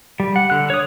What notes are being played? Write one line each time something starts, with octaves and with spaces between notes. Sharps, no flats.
G3
F#5
D3 F#6
C#5 D#6